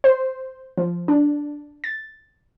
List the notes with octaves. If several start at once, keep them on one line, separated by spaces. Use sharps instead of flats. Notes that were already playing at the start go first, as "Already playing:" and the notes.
C5
F3
D4
A6